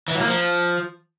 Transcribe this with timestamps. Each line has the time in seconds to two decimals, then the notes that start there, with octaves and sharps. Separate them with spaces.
0.08 E3
0.14 F#3
0.21 A#3
0.27 F3